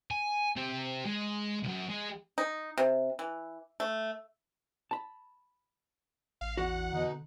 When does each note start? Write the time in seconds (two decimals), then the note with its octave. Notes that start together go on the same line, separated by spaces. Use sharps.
0.11 G#5
0.57 C4 G4
1.06 G#3
1.63 C2 F#2
1.89 G#3
2.38 D#4
2.78 C3
3.19 E3
3.80 A3
4.91 A5 B5
6.41 A1 F5
6.57 E2 F#4 F#5
6.93 B2 D3 D#4